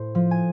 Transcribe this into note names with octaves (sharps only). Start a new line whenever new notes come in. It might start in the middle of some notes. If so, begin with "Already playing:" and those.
Already playing: A2 C5
F3
G#5